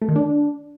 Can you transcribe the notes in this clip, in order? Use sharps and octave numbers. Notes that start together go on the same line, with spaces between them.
A3
D#3
D4